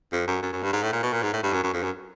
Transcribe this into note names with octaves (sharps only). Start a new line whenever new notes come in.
F2
F#2
F#2
F#2
G2
G#2
A2
A#2
B2
A#2
G#2
A2
G2
F#2
F#2
F2
F#2